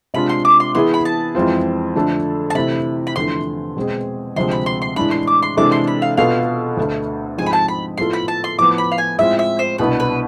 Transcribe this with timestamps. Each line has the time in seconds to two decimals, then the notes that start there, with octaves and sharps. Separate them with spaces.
0.14 C3 G#3 D4 F4 B5
0.29 C6
0.45 D6
0.60 C6
0.75 E3 B3 E4 G#4 C6
0.94 B5
1.05 A5
1.35 F2 E3 G#3 C4 F4
1.95 F2 D3 A3 D4 A4
2.50 A5
2.55 C3 E3 A3 E4 B5
3.07 B5
3.16 E2 D3 F3 A3 C6
3.77 B2 G#3 C4 G#4
4.36 D2 C3 F3 G#3 C4 C6
4.51 B5
4.66 C6
4.82 C6
4.96 A2 E3 G#3 D4 B5
5.11 C6
5.27 D6
5.42 C6
5.57 C3 E3 G#3 D4 A4 D6
5.72 C6
5.87 B5
6.02 F5
6.17 B2 B3 F4 A4 F5
6.77 D2 D3 A3
7.37 G#2 F3 G#3 C4 G#4 G#5
7.46 B5
7.53 A5
7.68 B5
7.98 A2 F3 B3 F4 A4 C6
8.13 B5
8.28 A5
8.44 C6
8.58 A2 F3 B3 D6
8.78 B5
8.92 F5
8.98 G#5
9.18 A2 G#3 C4 F4 E5
9.39 E5
9.59 C5
9.78 C2 B2 B3 D4 B4
10.00 B4